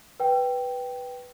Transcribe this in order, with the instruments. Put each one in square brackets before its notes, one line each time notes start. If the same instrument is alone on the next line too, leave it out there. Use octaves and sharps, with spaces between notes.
[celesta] B4 G5